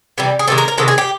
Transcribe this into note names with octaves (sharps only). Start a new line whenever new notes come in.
C3 E3 G3
G#4
C3 D#3 G#3 A4
A#4
A#4
C3 D#3 G#3 A4
G#4
G4